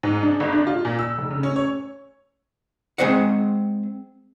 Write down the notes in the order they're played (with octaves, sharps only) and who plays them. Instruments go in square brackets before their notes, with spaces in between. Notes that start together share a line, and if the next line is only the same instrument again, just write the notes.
[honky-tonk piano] G#2
D4
G1
D4
F4
A#2
E6
F1
C#3
C#4
C#5
[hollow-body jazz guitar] G#3 C4 C5 D#5 F#5